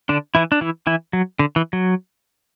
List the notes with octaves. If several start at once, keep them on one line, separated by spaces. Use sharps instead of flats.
D3 D4
E3 E4
D4
E3 E4
E3 E4
F#3
D3
E3
F#3